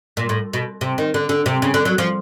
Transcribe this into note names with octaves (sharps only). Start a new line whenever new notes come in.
A#2
A2
B2
C3
D#3
D3
D3
C3
C#3
D3
F#3
F3